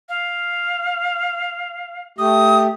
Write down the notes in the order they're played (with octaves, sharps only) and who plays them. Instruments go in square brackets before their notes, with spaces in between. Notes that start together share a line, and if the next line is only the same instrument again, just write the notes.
[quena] F5
[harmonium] A3 G4 [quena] D#6